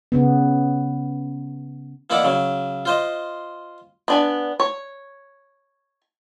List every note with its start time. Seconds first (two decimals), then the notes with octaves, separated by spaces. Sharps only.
0.12 C#3 B3
2.10 E3 A#3 D#4 E4 D5 F#5
2.24 C#3 F#3
2.85 F4 C5 D#5
4.08 B3 D4 G#5
4.60 C#5